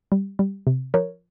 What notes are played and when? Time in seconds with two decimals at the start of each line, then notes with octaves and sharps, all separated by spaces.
0.12 G3
0.39 G3
0.67 C3
0.94 F3 A#4 C#5